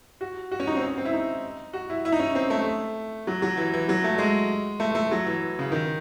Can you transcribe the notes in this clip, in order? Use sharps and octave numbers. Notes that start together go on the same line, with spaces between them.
F#4
F#4
C#4
D#4
C4
C#4
C4
E4
D#4
F#4
E4
E4
D#4
C#4
C4
A3
F#3
F#3
E3
E3
F#3
A3
G#3
A3
A3
F#3
E3
C#3
D#3